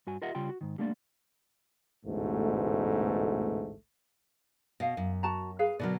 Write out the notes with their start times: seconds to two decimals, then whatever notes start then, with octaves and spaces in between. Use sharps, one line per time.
0.07 G2 F#4 G#5
0.22 F4 G4 A#4 D#5 E5 F#5
0.35 C#3 G3 F4 G5 C6
0.49 F#4
0.61 G#2 D#3
0.78 G3 A3 A#3 D4 D5
2.05 A1 D2 G#2 B2 A3
4.80 B2 D#5 F5
4.97 F#2
5.23 F#4 A5 A#5
5.59 G#4 B4 F5
5.79 B2 D3 F#3 A#4 B4 D5